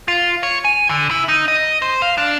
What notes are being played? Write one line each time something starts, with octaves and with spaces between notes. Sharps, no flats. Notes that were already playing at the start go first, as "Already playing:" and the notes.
F4
C#5
G#5
D3
E4
D#4
D#5
C5
F5
D4